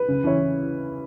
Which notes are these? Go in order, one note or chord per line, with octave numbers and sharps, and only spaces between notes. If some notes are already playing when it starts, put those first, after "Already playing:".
Already playing: B4
C#3
E3 C#4 E4 C#5